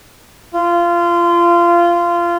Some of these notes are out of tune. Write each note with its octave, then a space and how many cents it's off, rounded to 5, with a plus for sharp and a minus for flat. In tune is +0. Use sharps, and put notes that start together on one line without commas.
F4 -20